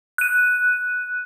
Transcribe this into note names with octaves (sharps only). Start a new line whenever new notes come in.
F#6 D#7